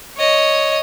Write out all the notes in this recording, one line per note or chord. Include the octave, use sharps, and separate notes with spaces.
C#5 D#5